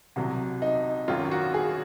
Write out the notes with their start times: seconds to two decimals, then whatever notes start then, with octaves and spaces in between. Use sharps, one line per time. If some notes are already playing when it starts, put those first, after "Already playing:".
0.16 C2 C3 F#3
0.62 D#4
1.08 G#1 F#2 D#3 F#3 C#4 F4
1.31 F#4
1.54 G#4